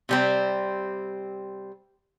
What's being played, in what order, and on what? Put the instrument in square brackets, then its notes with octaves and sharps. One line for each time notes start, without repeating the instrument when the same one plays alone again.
[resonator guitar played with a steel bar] C3 G3 C4